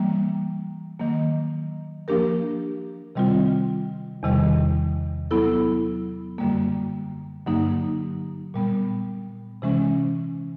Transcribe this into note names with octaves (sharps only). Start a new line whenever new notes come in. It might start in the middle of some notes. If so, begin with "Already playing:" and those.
Already playing: E3 G3 A#3
D#3 F#3 A#3
F3 A#3 D4 G4 A#4
C3 D#3 G3 C4 F4
E2 C3 D#3 G3
F#3 B3 E4 A4
F#2 D3 G3 A#3
G2 D3 F#3 A#3 D#4
A#2 G3 B3
C3 E3 G#3 C#4